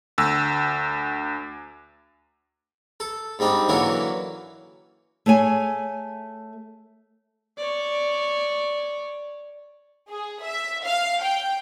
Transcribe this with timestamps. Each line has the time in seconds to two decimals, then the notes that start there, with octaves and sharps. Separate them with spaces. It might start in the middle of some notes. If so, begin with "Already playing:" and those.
0.18 D2 E6
3.00 A4
3.39 G#2 G3 C4 D4 D#4
3.68 D3 E3 F#3 A#3 C#4 E4
5.26 A3 G#4 C#5 G#5
7.57 C#5 D5
10.09 G#4
10.43 E5
10.85 F5
11.22 G5